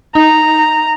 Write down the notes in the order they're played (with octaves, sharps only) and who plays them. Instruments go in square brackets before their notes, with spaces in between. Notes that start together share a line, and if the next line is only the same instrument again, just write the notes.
[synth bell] D#4 [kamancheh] A#5